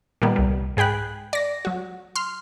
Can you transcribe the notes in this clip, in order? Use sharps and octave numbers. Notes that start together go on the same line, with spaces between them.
A#2 D#3 G3 A#3 B3
C2 G3
G#2 G#4 G5 B5 F#6
D5 A#6
F#3 F#4
C6 F6